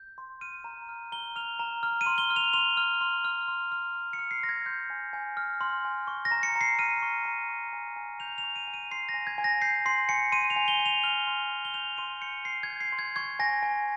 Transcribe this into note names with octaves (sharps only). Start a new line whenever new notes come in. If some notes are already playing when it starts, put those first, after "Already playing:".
Already playing: G6
C6
F6 D#7
A#5
F6
A#5 G7
F6 F7
A#5
F6
D#7
C6
G7
F6
F7
C6 F7
F6
C6
F6
C6
F6
C6
C#7
F6
C7
C6 A#6
G#6
C6 G6
G#5
G#5
F6
C6
G#5
C#6
A#6
A#5
C#7
A#5
C7
F6 D#7
C#6
A#5
C#6
G#5
G#5
G6 F7
F7
C#6
D#7
G#5
D#7
C6 C7
A#6
G#5
G#6
G#5
A#6
G6 C7
C6 C7
G#5 C#7
C6 D#7
F7
G#5
G7
G#5
F7
F6 G7
C6
G#5
G7
G6 F7
C6 D#7
G6 C#7
C6 C7
G#6
G6
C7
C6
G#6
C#6 G#6
G#5 A#6
G#5